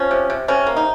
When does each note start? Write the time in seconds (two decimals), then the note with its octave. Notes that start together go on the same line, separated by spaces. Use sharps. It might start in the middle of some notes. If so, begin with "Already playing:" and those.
Already playing: F3 C#4
0.11 C3
0.30 C3
0.48 C3 C#4
0.67 A#3
0.76 D#4